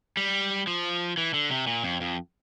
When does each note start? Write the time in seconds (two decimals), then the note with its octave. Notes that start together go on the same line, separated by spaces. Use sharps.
0.17 G3
0.67 F3
1.17 E3
1.34 D3
1.51 C3
1.67 A#2
1.83 F2
2.01 F2